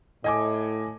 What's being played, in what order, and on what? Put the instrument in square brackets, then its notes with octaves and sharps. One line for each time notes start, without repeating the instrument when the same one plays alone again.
[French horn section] A2 [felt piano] D#5 G#5 D6